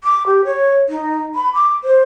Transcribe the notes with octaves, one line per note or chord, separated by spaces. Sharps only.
D6
G4
C#5
D#4
B5
D6
C5